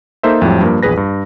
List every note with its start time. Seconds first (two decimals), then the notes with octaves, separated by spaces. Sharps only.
0.23 A#3 D#4 A4 C5 E5
0.42 F2 A2 F#3 G3
0.61 G2 F3 A#3
0.83 A#1 E2 G#4 B4 A#6
0.97 G2